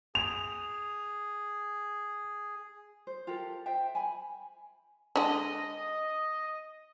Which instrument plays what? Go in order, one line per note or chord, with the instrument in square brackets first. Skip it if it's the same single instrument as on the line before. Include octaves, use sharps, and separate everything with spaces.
[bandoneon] G#4 [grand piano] F7
[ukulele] C5
F4 G4 A4 A#4
C5 E5 G5
G#5 B5
[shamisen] D3 G#3 [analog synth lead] D#5